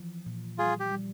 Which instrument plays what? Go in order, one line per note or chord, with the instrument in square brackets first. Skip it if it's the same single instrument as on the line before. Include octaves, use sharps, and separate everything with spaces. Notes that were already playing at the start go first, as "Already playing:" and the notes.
Already playing: [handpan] E3 F3
A#2
[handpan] G3 [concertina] F4 G#4
[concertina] G4
[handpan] G3